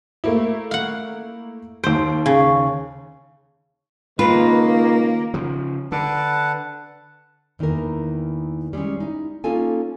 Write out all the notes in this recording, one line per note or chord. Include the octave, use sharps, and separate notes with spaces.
A3 A#3 E4
F5 F#5
D#2 C5 D7
C#3
C#2 D#3 A#3 F4 B4
C#3 F3
D3 B4 F#5 A5
E2 D#3 E3 A#3 A#4
G3 G#3 A#3 C#4
D#4 E4
A#3 C#4 D#4 F4 A4 G#5